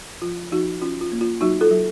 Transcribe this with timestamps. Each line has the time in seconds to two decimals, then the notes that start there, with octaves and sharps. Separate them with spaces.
0.22 F3 F4
0.51 F3 D#4 F#4
0.81 C#4 F4
1.01 F4
1.12 A#3
1.21 F4
1.41 F#3 D#4 F#4
1.61 F4 A4
1.71 F#3